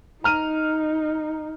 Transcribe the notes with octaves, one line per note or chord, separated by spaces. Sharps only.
D#4 A#5 F6 D#7